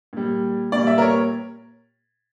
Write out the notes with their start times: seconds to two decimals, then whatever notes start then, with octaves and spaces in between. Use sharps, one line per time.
0.13 A#2 G3
0.72 A#2 G3 D5
0.87 E5
0.98 A#4
1.02 C#5